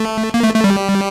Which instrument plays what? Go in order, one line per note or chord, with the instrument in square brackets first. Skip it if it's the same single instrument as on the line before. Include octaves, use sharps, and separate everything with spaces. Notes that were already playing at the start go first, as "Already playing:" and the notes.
Already playing: [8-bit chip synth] A3
A#3
A3
A3
G3